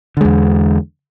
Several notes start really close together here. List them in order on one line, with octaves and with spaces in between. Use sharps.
D3 G#3 E2